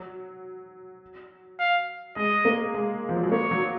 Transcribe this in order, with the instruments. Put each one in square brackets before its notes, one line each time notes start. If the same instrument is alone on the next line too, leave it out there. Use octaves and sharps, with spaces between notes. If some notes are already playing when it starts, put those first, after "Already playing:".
Already playing: [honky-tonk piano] F#3
[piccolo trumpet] F5
[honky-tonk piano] G#3 [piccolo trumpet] D#5
[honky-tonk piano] A#3
G#3
F3
F#3
G#3
[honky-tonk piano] A#3 [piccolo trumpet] C#5
[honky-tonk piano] F#3